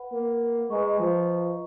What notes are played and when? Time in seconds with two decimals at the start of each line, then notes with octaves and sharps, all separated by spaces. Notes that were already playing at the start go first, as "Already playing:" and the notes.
Already playing: B4 F#5 B5
0.12 A#3
0.70 G#3 B4 D#5 A#5 C#6
0.99 F3